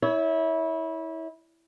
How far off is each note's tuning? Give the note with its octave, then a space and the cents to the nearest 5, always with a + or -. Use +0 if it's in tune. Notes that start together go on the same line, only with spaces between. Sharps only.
E4 -25 C#5 +20